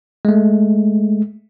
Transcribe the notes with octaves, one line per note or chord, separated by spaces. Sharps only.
G#3 A3